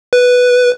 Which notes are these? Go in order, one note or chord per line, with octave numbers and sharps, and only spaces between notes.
B4